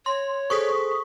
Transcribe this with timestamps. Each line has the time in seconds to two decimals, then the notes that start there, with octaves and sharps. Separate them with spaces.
0.06 C#5 C6
0.50 G#4 A4 C5 C#6 D#6 B6